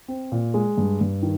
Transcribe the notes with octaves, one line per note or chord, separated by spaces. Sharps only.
C4
A#2
G#3
G2
G2
D#3